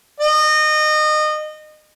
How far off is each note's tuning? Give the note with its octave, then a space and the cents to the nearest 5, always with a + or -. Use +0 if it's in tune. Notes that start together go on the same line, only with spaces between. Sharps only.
D#5 -25